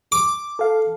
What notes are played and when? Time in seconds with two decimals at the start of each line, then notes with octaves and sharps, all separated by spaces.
0.12 D6
0.59 A4 F5